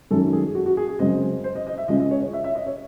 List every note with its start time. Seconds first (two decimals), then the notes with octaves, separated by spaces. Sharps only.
0.10 F#2 D#3 G#3 C#4 A4
0.33 G#4
0.55 F#4
0.66 F#4
0.77 G#4
0.88 G#4
0.99 F#2 C#3 G#3 C4 D#5
1.44 C5
1.55 D#5
1.67 D#5
1.78 E5
1.88 C#2 C#3 G#3 C#4 D#5
2.00 D#5
2.11 C#5
2.22 C#5
2.33 E5
2.44 E5
2.55 D#5
2.66 C#5